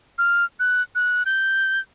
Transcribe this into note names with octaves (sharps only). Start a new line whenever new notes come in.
F6
F#6
F#6
G6